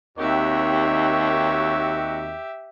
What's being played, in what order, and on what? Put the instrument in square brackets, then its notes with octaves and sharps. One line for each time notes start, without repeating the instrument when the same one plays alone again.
[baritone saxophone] D#2 [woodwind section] D#3 C4 F#4 [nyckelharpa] G4 E5 [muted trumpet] C#5